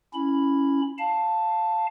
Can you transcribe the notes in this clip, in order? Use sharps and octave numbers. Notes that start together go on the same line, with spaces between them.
C#4 E4 B5
F5 A5